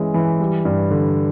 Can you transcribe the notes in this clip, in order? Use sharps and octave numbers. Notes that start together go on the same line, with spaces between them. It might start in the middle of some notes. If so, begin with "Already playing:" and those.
Already playing: E3 G#3 C#4
E3
G3
G2
D3